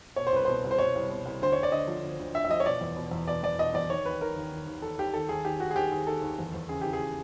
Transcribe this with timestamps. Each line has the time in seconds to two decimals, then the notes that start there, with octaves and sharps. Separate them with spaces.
0.16 B2 C#5
0.27 C5
0.32 C2 B4
0.45 B2 C5
0.64 C2
0.71 C5
0.79 B2 C#5
0.95 C2
1.10 B2
1.25 C2
1.42 D2 C5
1.52 D2 C#5
1.63 D5
1.72 D3 D#5
1.88 F3
2.03 D2
2.20 D2
2.34 D3 E5
2.45 E5
2.49 F3 D#5
2.60 C#5
2.66 B2 D5
2.81 E2
2.96 B2
3.11 E2
3.27 B2 D5
3.43 E2 D5
3.59 B2 D#5
3.74 E2 D5
3.89 D#3 C#5
4.05 D#2 B4
4.21 D#3 A#4
4.36 D#2
4.52 D#3
4.67 D#2
4.82 D#3 A4
4.98 D#2 G4
5.14 D#3 A4
5.29 D#2 G#4
5.45 D#3 G4
5.60 D#2 F#4
5.71 G#4
5.75 D#3 G4
5.91 D#2 G#4
6.07 D#3 A4
6.22 D#2
6.39 E2
6.54 E2
6.69 C#3 G#4
6.81 E3 G4
6.93 G#4